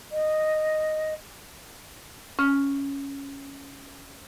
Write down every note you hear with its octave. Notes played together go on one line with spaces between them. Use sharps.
D#5
C#4 F6